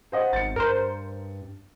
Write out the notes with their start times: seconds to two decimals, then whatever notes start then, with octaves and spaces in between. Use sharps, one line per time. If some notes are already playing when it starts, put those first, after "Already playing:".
0.12 C5 D#5 F#5
0.33 G#1 A6 C#7
0.56 G2 A#4 C5